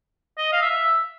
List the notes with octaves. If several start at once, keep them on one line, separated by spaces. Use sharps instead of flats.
D#5
F5
E5